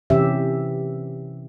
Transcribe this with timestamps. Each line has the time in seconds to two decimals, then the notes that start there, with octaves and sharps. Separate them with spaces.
0.10 C3 E3 C#4 G4 E5